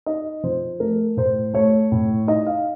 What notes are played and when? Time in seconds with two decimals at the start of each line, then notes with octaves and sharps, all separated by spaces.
0.06 D#4 D#5
0.44 F3 C5
0.80 A3 A#4
1.17 A2 C5
1.54 A3 C#5
1.92 A2
2.27 D#4 D#5
2.47 F5